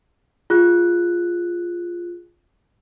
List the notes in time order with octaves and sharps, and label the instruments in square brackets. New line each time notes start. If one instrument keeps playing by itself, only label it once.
[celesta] F4 G#4 F#6